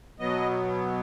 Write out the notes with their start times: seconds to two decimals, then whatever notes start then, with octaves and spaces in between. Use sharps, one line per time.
0.19 B2 F#3 B3 D#5